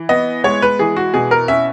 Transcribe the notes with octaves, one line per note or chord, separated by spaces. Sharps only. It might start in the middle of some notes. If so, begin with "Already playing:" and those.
Already playing: E3
B3 D#5
G#3 C#5
B4
E3 G#4
F#4
B2 G#4
A#4
C#4 E5